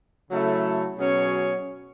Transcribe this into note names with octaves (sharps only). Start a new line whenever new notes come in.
C#3 F#3 A3 E4
B2 F#3 C#4 G#4 C#5